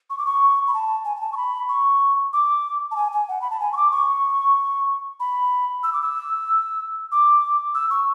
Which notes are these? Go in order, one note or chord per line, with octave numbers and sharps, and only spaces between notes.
C#6
D6
C#6
B5
A5
G#5
G#5
A5
C#6
B5
C#6
D6
A5
G#5
G#5
F#5
B5
A5
G#5
C#6
D6
C#6
B5
E6
D6
E6
D6
E6
C#6